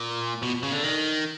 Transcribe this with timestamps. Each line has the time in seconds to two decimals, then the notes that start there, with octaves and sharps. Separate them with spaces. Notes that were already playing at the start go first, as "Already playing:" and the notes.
Already playing: A#2
0.42 B2
0.63 C#3
0.72 D3
0.83 D#3